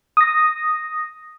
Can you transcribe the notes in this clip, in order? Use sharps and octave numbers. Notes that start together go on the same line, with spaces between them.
D#6 A#6